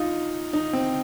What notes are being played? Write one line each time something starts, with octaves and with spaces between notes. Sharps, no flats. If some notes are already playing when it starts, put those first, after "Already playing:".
Already playing: D#4 F4
D#4
C4